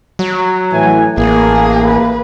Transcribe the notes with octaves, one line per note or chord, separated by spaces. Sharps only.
F#3
A2 E3 G#5
A1 A#3 G#4
B4